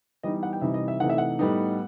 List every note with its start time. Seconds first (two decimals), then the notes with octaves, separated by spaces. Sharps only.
0.23 E3 G3 B3 D#4 D#5
0.43 F#5
0.53 G5
0.61 C3 E3 G3 D#4 E5
0.74 D#5
0.88 E5
1.00 C3 E3 A3 D#4 F#5
1.10 E5
1.18 F#5
1.39 A2 G3 B3 D#4